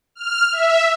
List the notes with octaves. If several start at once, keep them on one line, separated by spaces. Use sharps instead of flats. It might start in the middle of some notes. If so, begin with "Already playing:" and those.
F6
E5